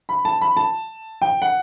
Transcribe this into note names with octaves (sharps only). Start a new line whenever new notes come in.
B5
A5
B5
A5
G5
F#5